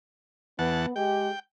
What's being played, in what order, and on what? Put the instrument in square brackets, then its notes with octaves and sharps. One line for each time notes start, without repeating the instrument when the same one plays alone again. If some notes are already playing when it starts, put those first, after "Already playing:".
[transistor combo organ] E2 F#5 A5 [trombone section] B3
[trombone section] G#3 G4 [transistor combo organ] G5